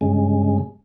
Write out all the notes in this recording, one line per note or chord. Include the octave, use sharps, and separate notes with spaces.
G2 C#3 G#3